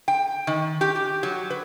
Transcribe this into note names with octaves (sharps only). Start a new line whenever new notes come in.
G5
D#3
G4
G4
F#3
B4